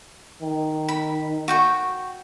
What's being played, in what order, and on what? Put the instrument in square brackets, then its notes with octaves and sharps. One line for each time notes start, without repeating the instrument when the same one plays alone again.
[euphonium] D#3
[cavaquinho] B5
F#4 G5 C#6